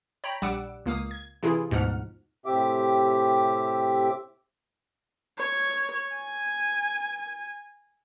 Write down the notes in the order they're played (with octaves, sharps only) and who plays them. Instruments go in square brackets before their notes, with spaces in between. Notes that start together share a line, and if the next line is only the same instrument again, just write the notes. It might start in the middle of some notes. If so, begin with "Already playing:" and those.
[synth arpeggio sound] C#5 G5 A#5 B5
A#1 G3 F#5 D6 E6 D7
C#2 A#3 F5 D#6
G#6
C3 E3 E4 F4 G#4
D2 G#2 B2 F3 F#5 F6
[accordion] A2 C3 C4 G4 E5 D6
[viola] C#5
G#5